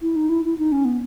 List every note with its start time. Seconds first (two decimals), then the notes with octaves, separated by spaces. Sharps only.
0.02 E4
0.16 D#4
0.29 E4
0.44 E4
0.58 D#4
0.72 C#4
0.85 B3